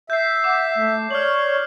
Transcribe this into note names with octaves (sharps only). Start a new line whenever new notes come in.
E5 G6 C7
F#5 D6
A3
C#5 D5 F6 F#7